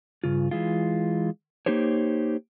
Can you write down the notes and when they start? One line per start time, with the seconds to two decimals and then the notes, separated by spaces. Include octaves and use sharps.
0.24 G2 C#3 F4
0.51 E3 G#3 F4
1.66 A#3 D#4 G4 C5 C#5